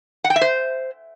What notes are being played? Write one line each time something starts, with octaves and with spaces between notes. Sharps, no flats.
F#5
G5
E5
C5